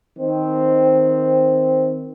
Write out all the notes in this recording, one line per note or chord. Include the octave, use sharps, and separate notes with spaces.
D#3 C4